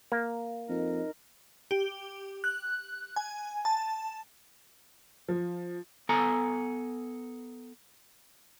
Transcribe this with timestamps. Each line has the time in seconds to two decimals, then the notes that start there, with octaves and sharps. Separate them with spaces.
0.12 A#3
0.69 F2 D#4 A#4 D#5
1.71 G4
2.44 F#6
3.16 G#5
3.65 A5
5.28 F3
6.09 B3 A4 G#5 A#5